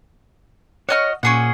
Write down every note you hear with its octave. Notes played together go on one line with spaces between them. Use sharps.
F#4 C#5 D#5 F6
A#2 C#4 G#4 F#5